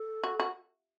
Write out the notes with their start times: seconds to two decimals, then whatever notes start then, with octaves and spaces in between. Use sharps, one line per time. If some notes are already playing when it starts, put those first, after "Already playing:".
Already playing: A4
0.23 F#4
0.40 F#4